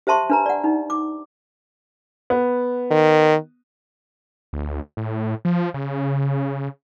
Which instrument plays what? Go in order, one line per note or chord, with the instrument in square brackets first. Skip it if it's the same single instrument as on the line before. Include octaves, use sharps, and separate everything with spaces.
[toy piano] G4 C5 E5 A5 C6 C#6
D4 B4 A#5
D5 F#5
D#4
D6
[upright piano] B3
[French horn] D#3
[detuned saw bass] D2
A2
F3
C#3